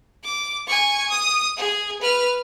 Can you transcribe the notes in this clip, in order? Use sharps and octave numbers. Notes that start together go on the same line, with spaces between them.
D6
G#5 C#6
D#6
G#4
B4 F6